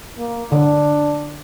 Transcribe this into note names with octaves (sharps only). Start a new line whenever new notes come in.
A#3
D3 D4